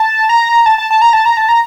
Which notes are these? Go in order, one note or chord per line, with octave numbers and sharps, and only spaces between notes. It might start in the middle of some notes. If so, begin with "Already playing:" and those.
Already playing: A5
A#5
A5
A5
A5
A#5
A5
A#5
A5
A#5